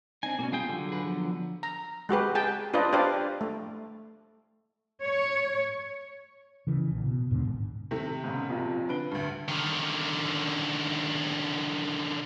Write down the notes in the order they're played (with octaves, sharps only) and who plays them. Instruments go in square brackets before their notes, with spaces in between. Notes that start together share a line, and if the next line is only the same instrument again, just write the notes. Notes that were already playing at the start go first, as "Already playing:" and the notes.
[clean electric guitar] C4 D4 D#4 [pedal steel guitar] G#5
[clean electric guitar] B2 [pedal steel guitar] A#3 C#4
[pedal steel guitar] G3 G#4 G5 [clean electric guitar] F4
[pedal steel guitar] D3 F#3
[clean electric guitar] G#4 B4
F3 B3
[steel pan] A#5
G#3 F#4 G4 B4
G#4 G5 A5
D4 F4 B4 D5 D#5
D4 G4 B4 C5 D5 F5
A3
[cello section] C#5
[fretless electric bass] C#3 E3
A#1
B2
D#2 G#2 B2 D3
G#1
[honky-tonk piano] C3 D#3 A3
[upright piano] G#2 C#3
B1 F2 A#2
[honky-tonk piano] D3 [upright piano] B4 D7 G7
[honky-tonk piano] D2 G2
[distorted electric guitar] D3 D#3